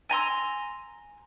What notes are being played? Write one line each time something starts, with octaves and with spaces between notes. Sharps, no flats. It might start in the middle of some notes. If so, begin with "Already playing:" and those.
G#5 A#5 C6 E6